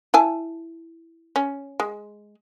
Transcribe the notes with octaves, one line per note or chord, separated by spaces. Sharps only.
E4 G#5 A5
C#4
G#3